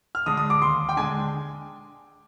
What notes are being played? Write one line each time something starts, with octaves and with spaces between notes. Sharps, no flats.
F6
D3 G#3 D4 D#6
D#6
D6
D#2 C6
G5
D3 G#3 D4 G#5